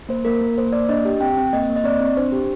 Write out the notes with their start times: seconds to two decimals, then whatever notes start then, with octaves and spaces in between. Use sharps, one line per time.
0.09 A#3 C5
0.25 A#3 A#4
0.41 A#3
0.57 A#3 C5
0.73 A#3 D5
0.89 D4 D#5
1.05 G4
1.21 C4 G5
1.37 C4
1.53 A#3 D#5
1.69 A#3
1.76 D#5
1.84 C4 D5
2.00 C4
2.17 D4 C5
2.32 G4